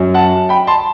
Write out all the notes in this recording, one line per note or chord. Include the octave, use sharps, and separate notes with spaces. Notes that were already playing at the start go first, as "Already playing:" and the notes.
Already playing: F#2 F#3
F#5 A5
G5 B5
A5 C6